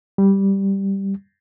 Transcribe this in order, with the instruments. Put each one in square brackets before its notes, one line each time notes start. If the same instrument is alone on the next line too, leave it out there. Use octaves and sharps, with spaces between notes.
[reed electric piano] G3